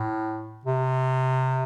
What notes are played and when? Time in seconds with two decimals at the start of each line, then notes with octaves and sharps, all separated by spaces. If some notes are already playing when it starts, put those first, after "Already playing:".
Already playing: A2
0.65 C3